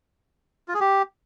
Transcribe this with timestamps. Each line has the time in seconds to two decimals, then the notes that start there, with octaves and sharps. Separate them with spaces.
0.68 F4
0.74 G#4
0.80 G4